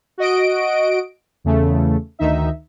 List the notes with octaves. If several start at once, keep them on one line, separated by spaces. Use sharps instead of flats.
F#4 D#5 D7
E2 C#3 A3
D2 D#3 D#4 E5